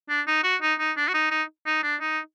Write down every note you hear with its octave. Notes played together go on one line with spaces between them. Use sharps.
D4
D#4
F#4
D#4
D#4
D4
F#4
D#4
D#4
D#4
D4
D#4